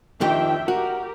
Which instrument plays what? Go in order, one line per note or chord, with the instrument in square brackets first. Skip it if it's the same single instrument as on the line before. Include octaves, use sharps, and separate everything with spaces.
[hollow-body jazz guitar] F2 D#3 G4 [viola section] D4 E5 G5
[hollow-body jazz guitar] F#4 [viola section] G4 A#4